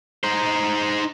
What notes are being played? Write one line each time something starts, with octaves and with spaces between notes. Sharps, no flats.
D#4 C5